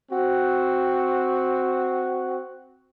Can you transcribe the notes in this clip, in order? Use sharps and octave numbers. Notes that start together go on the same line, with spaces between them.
C4 F#4